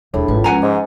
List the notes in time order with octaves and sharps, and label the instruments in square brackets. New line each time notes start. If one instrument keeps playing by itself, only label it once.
[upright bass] D#1 [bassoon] A2 [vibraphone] D4 G#4 B5
[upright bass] G#1 [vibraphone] F4 B4
[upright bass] F3 [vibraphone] G#3 C#4 [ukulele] F#5 G#5 A#5
[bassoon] G#2 [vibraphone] D6